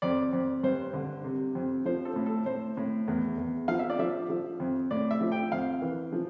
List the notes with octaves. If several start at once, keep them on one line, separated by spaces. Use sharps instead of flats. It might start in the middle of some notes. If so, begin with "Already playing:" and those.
F2 D5
F2
G2 C5
D3
C3
F2
F3 C5
A4
A2
A4
A2 C5
A2
E2
E2
F3 F5
E5
D5
F3 E5
F3
F2
A2 D5
E5
F3
G5
F2 F5
E3
F3